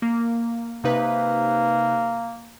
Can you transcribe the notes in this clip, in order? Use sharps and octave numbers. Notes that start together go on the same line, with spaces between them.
A#3
C3 A#3 D#4 B4